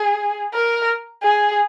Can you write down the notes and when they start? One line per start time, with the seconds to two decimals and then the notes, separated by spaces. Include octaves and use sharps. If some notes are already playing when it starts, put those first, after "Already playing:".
Already playing: G#4
0.54 A#4
1.23 G#4